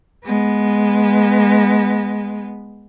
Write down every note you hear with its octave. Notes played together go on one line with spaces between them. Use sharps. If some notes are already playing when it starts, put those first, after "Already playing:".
G#3 B3